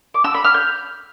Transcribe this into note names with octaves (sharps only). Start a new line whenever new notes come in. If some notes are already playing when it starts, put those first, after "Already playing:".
D6
E6
B5
F6
G6